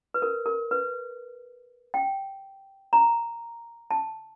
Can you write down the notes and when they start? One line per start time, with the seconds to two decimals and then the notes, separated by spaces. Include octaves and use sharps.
0.14 B4
0.22 A#4
0.46 A#4
0.71 B4
1.94 G5
2.93 A#5
3.91 A5